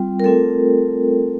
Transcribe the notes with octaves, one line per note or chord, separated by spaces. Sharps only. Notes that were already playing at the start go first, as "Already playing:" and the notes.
Already playing: G3 C4 F4 G5
A#4
A3 C4 F4 A4